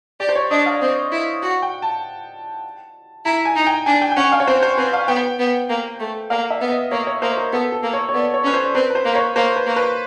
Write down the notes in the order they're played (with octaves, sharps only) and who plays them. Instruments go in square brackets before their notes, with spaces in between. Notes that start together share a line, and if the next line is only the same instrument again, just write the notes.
[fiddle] G4 [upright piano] D5
[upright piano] C5
C#5
[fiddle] D4 [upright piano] D#5
[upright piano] F5
[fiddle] C4
E4
[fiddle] F#4 [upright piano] F#5
[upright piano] G5
A5
[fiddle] E4 [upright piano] A#5
[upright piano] G#5
[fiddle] D#4
[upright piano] G5
[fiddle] D4 [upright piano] G#5
[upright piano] G5
G5
[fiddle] C#4 [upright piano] F#5
[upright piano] F5
C#5
[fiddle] C4 [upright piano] C5
[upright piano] C5
[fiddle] C4 [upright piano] B4
[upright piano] F5
[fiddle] B3 [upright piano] G5
[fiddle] B3
A#3
A3
[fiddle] A#3 [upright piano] F5
[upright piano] E5
[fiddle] B3
[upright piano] D#5
[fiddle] A#3 [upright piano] C#5
[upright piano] C#5
[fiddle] A#3 [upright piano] C5
[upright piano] A#4
[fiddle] B3 [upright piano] A4
[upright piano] A4
[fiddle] A#3
[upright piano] C#5
C#5
[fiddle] B3 [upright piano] D5
[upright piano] C#5
[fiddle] C#4 [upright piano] B4
[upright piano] C5
[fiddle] C4 [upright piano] B4
[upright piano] B4
C5
[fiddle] A#3
[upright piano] C#5
[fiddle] A#3 [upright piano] C5
[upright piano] B4
[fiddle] A#3
[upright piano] B4